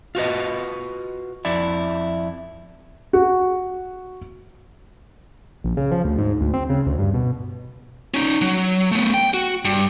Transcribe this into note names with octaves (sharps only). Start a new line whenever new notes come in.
F4 F#4 B4 D#5
F2 E4 D5 E5
F#4
A#1
C#3
F3
D2
G#2
D2
C4
C#3
D2
G2
B2
C#4 D#4
F#3
A3 B3
G5
F#4
G2